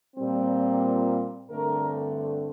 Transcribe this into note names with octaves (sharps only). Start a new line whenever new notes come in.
A#2 G3 C4
G2 D3 A3 C4 A#4